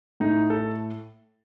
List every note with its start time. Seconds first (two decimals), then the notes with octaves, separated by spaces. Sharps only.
0.20 A2 A3 D#4
0.50 A4